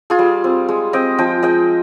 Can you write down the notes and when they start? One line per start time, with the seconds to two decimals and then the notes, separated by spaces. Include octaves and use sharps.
0.10 F4 G#4
0.19 G3
0.44 C4
0.69 G#3
0.93 C4 D#5 G5
1.19 F3 D#5 G5
1.43 G#3 D#5 G5